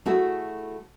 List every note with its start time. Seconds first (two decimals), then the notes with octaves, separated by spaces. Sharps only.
0.06 A3 E4 F#4 G#4 A4